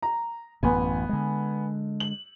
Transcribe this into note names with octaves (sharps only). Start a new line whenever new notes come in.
A#5
A1 F#2 B3 G#5
D3 G#3
F#7